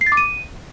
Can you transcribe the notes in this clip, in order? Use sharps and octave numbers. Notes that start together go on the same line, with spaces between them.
C7
A6
D6
D#7